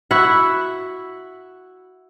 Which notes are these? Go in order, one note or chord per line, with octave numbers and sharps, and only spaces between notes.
E4 F#4 E5 F#5